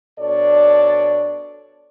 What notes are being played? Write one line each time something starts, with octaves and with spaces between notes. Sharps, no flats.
B2 D4 A4 C#5 D5